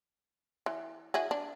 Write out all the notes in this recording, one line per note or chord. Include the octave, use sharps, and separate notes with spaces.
E3
E4 F#4 G#4
D4